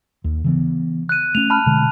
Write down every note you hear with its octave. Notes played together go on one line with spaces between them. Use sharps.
D#2
C#3 E3 B3
F#6 D#7
A3 C#4 F7
A5 B5 F6
B2 D3 G#3